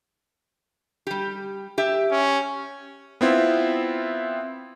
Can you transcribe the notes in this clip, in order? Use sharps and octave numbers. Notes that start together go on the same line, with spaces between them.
G3 G4
G4 E5
C#4
B3 C4 E4 F4